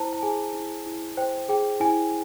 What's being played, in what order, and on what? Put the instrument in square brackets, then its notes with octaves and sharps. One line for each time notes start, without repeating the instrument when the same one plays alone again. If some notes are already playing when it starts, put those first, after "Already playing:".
Already playing: [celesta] E4 C5 A5 A#5
A5
G#4 G#5
E4
E4
C5 G5
G#4 G5
E4 G#5